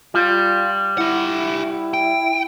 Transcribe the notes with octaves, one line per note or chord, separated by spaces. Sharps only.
G3 F4
E4 G4 F#5
G5